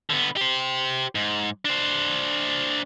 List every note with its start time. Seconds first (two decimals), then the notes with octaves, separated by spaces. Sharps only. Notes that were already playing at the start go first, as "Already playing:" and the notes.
0.10 D3 B3
0.37 G4 C5
1.15 G#2
1.65 D4 C5